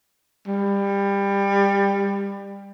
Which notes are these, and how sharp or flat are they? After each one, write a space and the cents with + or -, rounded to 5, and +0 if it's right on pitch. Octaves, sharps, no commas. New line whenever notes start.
G3 +20